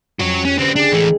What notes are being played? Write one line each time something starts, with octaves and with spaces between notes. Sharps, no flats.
F2 C#4 F#4 C#5
C#4 G4 F#6 B6
D3 B3 C4
C#2 D4 G4 G#4
E3 G#3 A3